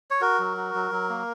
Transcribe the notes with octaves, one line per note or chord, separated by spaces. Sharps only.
C#5
F#4 A#4
F#3
F#4
F#3
F#3
A#3